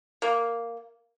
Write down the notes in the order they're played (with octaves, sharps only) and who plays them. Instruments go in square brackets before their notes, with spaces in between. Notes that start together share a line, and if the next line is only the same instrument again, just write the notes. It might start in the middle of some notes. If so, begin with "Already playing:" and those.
[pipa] A#3